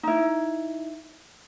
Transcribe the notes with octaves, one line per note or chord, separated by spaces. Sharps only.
D#4 E4